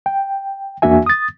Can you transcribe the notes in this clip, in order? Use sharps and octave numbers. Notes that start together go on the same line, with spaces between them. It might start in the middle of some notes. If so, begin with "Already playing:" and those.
G5
E2 A#3 D4 F#4 E5 G#5
D#6 A6